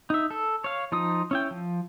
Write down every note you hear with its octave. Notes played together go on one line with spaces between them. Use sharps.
D#4 E5
A4
C#5 F5
F3 D#4 F4 D#6
C#4 E4 G5
F3